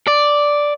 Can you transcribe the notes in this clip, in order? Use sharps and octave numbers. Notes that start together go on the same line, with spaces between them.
D5